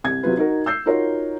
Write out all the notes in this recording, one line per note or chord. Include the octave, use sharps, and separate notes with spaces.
C2 G#6
C3 F#3 F4 B4
D#4 F#4 A#4
E6 G6 C7
D#4 F4 F#4 A#4 C#5